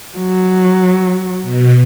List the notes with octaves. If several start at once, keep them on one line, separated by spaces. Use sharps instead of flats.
F#3
B2